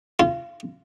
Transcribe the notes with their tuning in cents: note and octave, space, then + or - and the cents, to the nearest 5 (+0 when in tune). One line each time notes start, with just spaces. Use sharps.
F4 -30